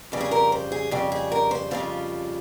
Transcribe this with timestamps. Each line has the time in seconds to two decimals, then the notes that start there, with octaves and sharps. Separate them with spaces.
0.12 F2 C#3 G3
0.21 G#4
0.31 A#4
0.52 C5
0.72 G#4
0.91 F2 C#3 G3 G4
1.12 G#4
1.32 A#4
1.51 C5
1.71 F2 C#3 G3 F4